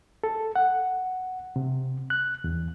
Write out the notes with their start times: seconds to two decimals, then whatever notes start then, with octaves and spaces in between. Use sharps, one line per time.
0.24 A4
0.56 F#5
1.56 C3
2.10 F#6
2.44 E2